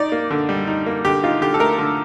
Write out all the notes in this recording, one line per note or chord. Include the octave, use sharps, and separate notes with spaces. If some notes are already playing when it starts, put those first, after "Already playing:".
Already playing: D#4 D5
A#3
D3
G3
D#4
A#3
D3 G4
D#4 F4
D3 G4
A4
A3 A#4
D3